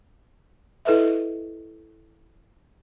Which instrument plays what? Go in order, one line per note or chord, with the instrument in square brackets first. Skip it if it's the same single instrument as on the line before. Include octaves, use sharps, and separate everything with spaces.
[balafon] E4 A4 B4 D#5 E5